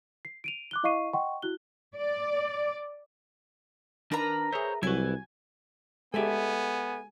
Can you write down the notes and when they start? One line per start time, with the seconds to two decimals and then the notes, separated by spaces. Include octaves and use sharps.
0.25 C7
0.44 D7 D#7 F7
0.71 D6 F#6 G7
0.83 E4 D#5 F5 C#6 C7 D#7
1.13 D#5 F#5 G5 C6 C#6
1.42 E4 F#4 F#6 G7
1.95 D5
4.12 D#3 D4 A#4 B4 A#5
4.53 G#4 C5 C#5 E5
4.83 C2 F#3 E4 F#4 B4 G#5
6.14 G#3 B3 G4 A4 D5 E5 G#5